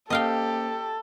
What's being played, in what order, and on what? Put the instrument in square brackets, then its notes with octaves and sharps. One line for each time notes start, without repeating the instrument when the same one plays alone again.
[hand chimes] A#3 C#4 C5 [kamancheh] G4 [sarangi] A4 [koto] D#5 F5 G5